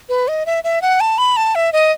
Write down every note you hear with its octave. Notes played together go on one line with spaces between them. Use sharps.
B4
D#5
E5
E5
F#5
A5
B5
A5
E5
D#5